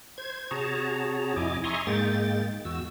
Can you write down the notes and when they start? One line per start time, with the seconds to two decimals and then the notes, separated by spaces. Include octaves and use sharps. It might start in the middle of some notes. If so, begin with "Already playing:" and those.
0.18 C5 G#6
0.51 C3 F#4 G#4 C#5 A5 A#5
1.36 F2 E4 D#5 G#5 D6
1.64 E5 G#5 A#5 C6 C#6 D#6
1.87 G#2 G#3 A#3 G5 A6
2.65 E2 F#4 E6